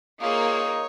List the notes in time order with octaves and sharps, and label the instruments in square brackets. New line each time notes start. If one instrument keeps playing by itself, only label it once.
[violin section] A#3 [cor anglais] D#4 [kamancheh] F4 G#4 [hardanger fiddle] C#5